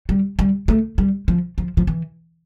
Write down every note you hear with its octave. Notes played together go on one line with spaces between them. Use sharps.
G3
G3
A3
G3
F3
F3
F3
E3